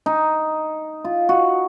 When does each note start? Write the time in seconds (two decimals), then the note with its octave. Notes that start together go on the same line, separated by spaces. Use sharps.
0.06 D#4
1.04 F4
1.29 F#4